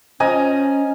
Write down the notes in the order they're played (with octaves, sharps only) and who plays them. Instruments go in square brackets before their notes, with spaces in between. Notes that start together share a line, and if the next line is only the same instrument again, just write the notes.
[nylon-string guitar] F3 [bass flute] C#4 [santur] D#5 G#5 A#5